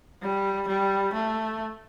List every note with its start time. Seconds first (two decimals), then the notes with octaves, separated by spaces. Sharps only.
0.22 G3
0.68 G3
1.13 A3